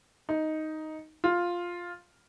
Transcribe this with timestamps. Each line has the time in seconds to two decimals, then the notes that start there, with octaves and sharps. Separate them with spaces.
0.29 D#4
1.24 F4